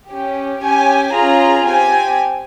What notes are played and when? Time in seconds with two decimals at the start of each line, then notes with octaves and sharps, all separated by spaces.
0.10 C#4 G4
0.62 C#4 G4 G#5
1.14 C#4 F4 G#4 A#5
1.65 C4 G4 G#5